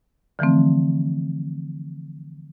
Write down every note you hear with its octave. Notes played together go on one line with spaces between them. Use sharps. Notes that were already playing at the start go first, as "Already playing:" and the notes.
D3 E3 F3 A3 C4